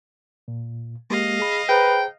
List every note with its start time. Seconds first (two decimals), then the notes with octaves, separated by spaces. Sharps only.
0.48 A#2
1.10 G#3 A#3 G4 D#5 F5
1.40 G#4 B5
1.69 G#4 B4 C5 G5 A#5